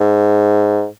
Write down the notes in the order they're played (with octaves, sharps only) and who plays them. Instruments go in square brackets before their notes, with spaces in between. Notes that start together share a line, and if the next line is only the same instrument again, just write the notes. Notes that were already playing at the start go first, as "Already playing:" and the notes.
[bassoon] G#2